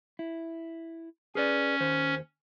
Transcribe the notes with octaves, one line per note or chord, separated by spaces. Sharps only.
E4
C#4 G#4 B4 D5
D#2 C5